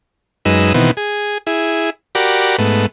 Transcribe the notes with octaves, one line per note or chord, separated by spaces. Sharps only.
F#2 G#3 D#4 B4 E6
B2 D#3 E3 B3 C4
G#4
E4 G#4
F#4 G4 A#4 D5 B5
G#2 A3 B3